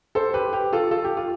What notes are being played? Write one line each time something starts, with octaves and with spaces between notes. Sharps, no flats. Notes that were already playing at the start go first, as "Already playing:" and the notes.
A4 C5
G4 B4
G4
F4 A4
F4 A4
G4
F4